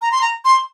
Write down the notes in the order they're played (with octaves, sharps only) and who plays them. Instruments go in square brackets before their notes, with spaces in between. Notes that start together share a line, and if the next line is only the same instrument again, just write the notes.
[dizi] A#5
C6
A#5
C6